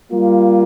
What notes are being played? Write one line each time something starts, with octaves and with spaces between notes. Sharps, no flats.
G3 A#3 F4